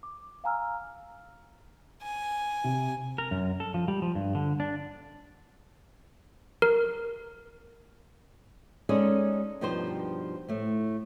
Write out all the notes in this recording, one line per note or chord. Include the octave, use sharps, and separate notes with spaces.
D6
F5 F#5 G#5 A#5 E6 F6
G#5
C3
A#4
F#2
A4
F3
G3
F3
G2
D3
D4
A#4
G#3 C#4 D#4 G#4 A4 D5
G2 B2 F3 D#4 G4 C5
A2 A3